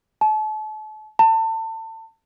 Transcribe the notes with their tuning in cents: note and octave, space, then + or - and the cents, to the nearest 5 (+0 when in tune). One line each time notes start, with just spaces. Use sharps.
A5 -35
A5 +30